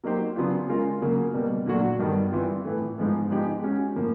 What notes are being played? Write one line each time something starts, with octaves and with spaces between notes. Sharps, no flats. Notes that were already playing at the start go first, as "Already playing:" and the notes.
F#3 A#3 D#4 G4 C5
C#3 F#3 B3 D4 F4
G#3 C#4 F4 A#4
C#3 F#3 A#3
B2 G3 A#3
A#2 F#3 A3 D4 F#4
G2 D#3 G3 B3
E3 G3 C4 F4
A2 E3 A3
G#2 F3 G#3 B3
F3 G#3 B3 D#4 G4
G#3 C#4 F#4
A2 F3 A#3